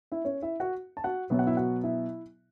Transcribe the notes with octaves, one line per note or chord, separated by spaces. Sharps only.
E4 E5
C#4 C#5
E4 E5
F#4 F#5
A5
F#4 F#5
B2 F#3 B3 E5
F#5
E4 E5
F#4 F#5
E4 E5